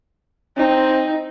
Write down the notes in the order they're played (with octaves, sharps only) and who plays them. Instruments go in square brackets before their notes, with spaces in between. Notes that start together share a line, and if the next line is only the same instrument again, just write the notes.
[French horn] C4 [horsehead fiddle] D#4